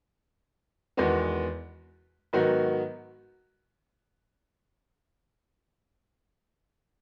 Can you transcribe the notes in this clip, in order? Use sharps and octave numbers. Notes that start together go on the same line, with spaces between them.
E2 D#3 G#3 B3 F#4
G#2 D#3 F#3 B3 F#4